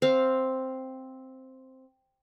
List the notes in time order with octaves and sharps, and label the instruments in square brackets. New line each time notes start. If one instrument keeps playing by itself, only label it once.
[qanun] C4 F5